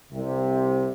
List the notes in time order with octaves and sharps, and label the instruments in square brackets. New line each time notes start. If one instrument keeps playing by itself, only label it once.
[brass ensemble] C2 C3